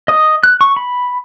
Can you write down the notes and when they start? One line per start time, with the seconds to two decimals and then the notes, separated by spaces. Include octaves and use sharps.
0.08 D#5 D#6
0.43 F#6
0.61 C#6
0.76 B5